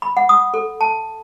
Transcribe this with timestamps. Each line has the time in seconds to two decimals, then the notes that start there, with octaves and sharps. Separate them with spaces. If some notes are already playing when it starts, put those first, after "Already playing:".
0.02 B5
0.17 F#5
0.29 D#6
0.54 A4
0.81 A5